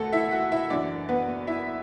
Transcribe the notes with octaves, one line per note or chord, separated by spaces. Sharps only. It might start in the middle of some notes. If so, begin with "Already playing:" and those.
Already playing: E1 D2 D3 A3 F#4 A4
E4 E5
F#4 F#5
E4 E5
F#1 F#2 E3 D4 D5
B3 B4
E4 E5